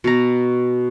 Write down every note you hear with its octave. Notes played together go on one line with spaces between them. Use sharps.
B2 A#5